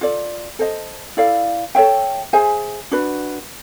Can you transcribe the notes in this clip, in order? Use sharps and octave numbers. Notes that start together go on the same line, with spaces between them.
F4 A4 D5
A4 C5 D#5
E4 A4 D5 F5
A4 C#5 E5 G5
G#4 C5 E5 G#5
D4 F#4 B4